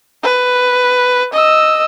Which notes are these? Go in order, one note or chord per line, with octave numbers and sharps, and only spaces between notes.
B4
D#5 E6